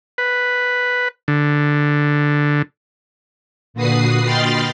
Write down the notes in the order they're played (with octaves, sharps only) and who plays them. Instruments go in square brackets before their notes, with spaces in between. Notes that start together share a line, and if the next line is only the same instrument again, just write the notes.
[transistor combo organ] B4
D3
[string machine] A#2 D3 F#4 B4 D#6 C7
D#5 G5 B5 C6 F6 A6